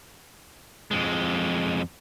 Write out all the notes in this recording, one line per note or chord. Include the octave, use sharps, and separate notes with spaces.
F2 G#3